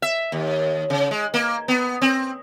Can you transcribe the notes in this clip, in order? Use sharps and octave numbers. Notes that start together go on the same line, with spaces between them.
E5
D#2
C#3
G#3
A#3
B3
C4